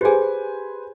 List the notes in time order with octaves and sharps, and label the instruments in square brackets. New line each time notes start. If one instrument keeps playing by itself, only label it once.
[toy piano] G4 G#4 [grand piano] B4 C5 G#5